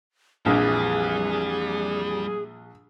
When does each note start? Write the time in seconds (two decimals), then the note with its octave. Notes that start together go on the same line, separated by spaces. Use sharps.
0.46 A#1 F2 E3 G3 G#4